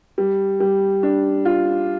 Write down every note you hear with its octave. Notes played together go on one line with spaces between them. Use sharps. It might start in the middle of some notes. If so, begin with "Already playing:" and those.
G3
G3
D4
F4